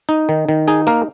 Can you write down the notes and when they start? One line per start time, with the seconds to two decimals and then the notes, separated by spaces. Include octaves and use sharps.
0.09 D#4
0.29 D#3
0.49 D#3
0.68 D#4 G#4
0.87 A#3 A#4